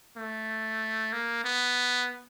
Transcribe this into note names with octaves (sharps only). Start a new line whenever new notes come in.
A3
A#3
B3